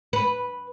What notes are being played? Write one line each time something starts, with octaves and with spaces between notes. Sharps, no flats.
B4